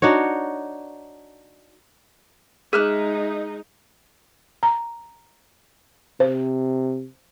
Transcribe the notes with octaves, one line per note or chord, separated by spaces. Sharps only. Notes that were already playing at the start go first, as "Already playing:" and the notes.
D4 D#4 F#4 C#5
G#3 D#4 G#4 E5 F6 F#6
A#5
C3 C5